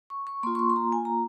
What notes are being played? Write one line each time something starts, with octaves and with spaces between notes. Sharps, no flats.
C#6
C#6
A#3 F4 C6
C#6
C6
C6
A#5
G#5
A#5